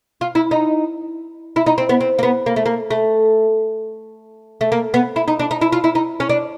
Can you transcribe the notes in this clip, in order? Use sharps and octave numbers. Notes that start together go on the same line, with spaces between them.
F4
E4
D#4
E4
D#4
C4
B3
C4
A#3
B3
A#3
A3
A#3
A3
A3
A#3
B3
E4
D#4
D4
D#4
E4
F4
E4
D#4
C#4
D4